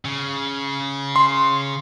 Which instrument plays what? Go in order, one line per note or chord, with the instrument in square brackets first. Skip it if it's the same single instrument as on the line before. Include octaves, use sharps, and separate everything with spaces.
[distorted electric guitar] C#3
[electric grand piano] C6